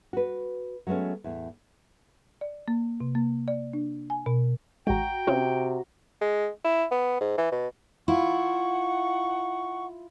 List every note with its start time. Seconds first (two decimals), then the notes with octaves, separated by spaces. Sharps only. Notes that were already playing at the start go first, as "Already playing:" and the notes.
0.13 F#4 B4
0.87 F#3 G#3 A3 B3 C#4
1.24 E2 A2
2.41 D5
2.68 A#3
3.00 C3
3.15 A#3
3.48 D5
3.73 D4
4.10 G#5
4.26 B2
4.87 A1 G#3 F#4 G5 A#5
5.27 C3 C4 C#4 F4
6.21 G#3
6.65 E4
6.91 B3
7.21 G#2
7.38 E3
7.52 B2
8.08 E4 F4 F#5 C#6